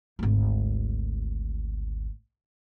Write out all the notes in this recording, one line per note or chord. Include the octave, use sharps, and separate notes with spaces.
G#1 D2